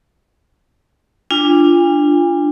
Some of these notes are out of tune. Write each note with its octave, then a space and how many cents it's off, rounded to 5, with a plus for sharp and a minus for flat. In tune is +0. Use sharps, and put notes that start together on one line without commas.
D4 +0 F4 -20 G#5 -45